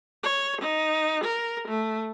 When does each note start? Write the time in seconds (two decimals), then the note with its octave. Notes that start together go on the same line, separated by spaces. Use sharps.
0.24 C#5
0.61 D#4
1.24 A#4
1.68 A3